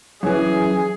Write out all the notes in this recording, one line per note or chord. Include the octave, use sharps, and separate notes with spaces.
F#2 E3 G#4